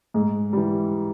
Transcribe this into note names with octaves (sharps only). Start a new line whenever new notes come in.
G#2 G#4
E3 G3